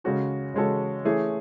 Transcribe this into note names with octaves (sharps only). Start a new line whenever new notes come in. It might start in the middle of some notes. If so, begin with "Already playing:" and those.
C#3 G#3 C#4 F#4 A4
C#3 G#3 C#4 F#4 A4
E3 A3 C#4 G#4